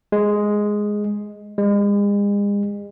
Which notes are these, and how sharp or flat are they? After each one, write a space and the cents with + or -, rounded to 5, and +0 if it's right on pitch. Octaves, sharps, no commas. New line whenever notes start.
G#3 +0
G#3 -40